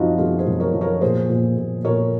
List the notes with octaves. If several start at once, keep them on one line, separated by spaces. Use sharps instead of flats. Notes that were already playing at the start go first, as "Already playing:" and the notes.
Already playing: F#2 F3 C4 D#4 F4 F#4
F#2 F4 G#4
G#4 C5
F#2
A#4 C#5
F3
A#4 C#5
A#2 G#4 C5
A#2
A#2
A#2 A#4 C#5